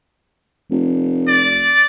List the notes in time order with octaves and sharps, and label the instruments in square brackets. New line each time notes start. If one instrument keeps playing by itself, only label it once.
[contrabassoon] F1
[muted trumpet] D5